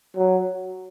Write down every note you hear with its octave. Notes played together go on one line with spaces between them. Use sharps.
F#3